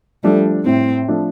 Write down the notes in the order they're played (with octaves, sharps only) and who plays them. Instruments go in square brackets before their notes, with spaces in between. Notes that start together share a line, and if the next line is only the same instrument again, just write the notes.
[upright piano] F3 A3 D4 A4 [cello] G3
[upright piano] A2 [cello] C4
[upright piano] F3 A3 D4 A4